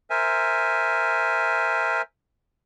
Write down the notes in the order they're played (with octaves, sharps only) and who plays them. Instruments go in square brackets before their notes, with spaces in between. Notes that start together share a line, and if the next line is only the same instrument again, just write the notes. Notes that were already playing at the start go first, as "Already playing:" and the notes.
[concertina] A#4 C5 E5 G#5